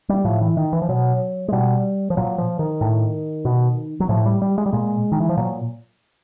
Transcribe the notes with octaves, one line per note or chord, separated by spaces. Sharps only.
G3
A2 F3
E3
D#3
E3
F3
B2 F#3
G#3
B2 G3
F3
A#2 F#3
F3
D#3
A2
B2
F#3
A2 F3
G3
G3
G#3
G3
A#2 G#3
D#3
E3
F3
A#2 F#3